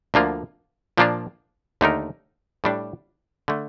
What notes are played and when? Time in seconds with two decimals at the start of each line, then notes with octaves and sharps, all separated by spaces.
0.14 D2 D3 F3 A#3 F4
0.97 A#2 F3 A#3 D4 F4
1.81 D#2 D3 A3 D#4 A#4
2.64 A2 G3 D4
3.48 D3 A3